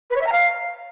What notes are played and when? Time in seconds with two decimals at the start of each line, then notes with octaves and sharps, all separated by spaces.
0.10 B4
0.15 C#5
0.21 E5
0.26 A#5
0.31 F5